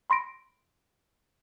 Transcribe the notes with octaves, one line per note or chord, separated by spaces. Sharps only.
B5 C6 A#6 D7